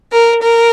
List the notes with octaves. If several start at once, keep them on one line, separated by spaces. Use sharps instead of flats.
A#4
A#4